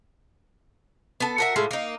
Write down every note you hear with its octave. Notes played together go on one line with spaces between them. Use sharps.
B3 A4
F#4 A#4 E5
A2 G#3 F4 E5
A#3 D#4